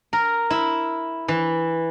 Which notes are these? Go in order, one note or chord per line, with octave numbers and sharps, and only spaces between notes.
A#4
E4
E3